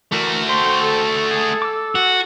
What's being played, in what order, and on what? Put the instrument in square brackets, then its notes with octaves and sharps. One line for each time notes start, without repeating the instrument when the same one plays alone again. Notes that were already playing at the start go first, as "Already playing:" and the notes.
[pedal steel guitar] E3 A#4 [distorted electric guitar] A3 F#4
[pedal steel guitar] C5 G5 C6
[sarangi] A4
[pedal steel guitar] G#4
D6 E6
[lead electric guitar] F#4